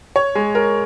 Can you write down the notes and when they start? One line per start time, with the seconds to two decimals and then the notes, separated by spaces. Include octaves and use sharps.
0.16 C#5
0.35 G#3
0.55 A#4